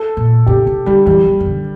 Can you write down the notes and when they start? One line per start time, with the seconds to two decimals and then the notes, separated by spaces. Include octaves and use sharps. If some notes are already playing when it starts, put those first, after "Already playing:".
Already playing: A4
0.17 A#2
0.46 C3 G4
0.67 C3
0.86 D3 G3
1.06 E3 G3
1.26 E3
1.40 E3
1.46 D3